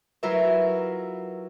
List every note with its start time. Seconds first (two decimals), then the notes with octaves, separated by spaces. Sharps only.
0.23 F#3 E4 F4 A#4 B4 E5